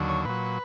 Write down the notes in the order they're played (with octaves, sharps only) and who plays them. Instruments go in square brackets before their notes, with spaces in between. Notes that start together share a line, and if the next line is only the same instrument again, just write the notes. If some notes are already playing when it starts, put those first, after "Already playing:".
Already playing: [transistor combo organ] D#2 D3 F#3
C#5
A#2 F#3 B4